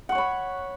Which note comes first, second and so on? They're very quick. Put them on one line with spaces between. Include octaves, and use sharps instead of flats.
F#5 C#6 C#5 B5